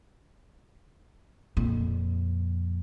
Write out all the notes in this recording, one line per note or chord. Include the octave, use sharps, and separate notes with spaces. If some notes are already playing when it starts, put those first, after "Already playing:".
F2 A#2